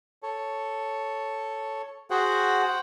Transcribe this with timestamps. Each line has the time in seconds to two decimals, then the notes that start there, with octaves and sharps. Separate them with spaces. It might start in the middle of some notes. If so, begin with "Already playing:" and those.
0.23 A4 C#5
2.10 F#4 G#4 C5 F#5 G5